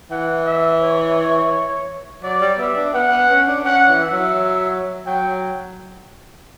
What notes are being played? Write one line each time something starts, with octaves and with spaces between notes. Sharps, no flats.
E3 F#5
E5
C#5
F#3 D5
G3
B3 E5
D4
B3 F#5
B3
C#4
D4
C#4 F#5
E3
E5
F#3
F#3 G5